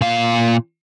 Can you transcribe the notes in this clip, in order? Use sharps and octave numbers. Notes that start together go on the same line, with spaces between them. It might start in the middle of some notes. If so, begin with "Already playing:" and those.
A#2 F5